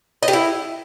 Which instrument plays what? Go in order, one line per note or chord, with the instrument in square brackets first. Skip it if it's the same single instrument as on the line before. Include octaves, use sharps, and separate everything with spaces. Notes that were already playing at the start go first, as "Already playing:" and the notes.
[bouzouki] D#5
G4
E4